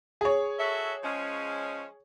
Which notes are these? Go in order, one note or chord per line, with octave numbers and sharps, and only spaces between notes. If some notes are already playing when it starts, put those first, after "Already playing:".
G#4 C#5
F#4 A4 E5
F3 G#3 C#4